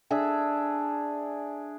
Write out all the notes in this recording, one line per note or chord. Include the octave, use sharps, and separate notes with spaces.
D4 G#4 E5